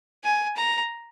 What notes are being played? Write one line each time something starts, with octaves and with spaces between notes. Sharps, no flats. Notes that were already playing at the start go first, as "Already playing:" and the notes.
G#5
A#5